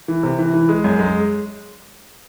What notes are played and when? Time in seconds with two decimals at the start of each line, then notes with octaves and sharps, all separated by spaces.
0.08 E3
0.23 C3
0.39 E3
0.54 E3
0.69 G#3
0.84 F#2
0.99 G#3